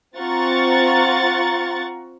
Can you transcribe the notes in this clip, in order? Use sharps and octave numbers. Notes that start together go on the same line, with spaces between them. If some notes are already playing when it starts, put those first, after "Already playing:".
C4 F4 F#5 A#5 C#6 A6